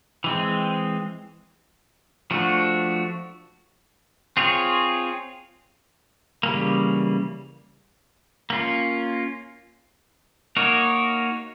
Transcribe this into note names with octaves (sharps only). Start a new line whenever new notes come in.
E3 G#3 C4
F3 A3 D4 F#4
C4 F4 G#4 C#5
C#3 E3 G3 A#3
A#3 C#4 F4
A#3 D#4 F#4 A#4 C#5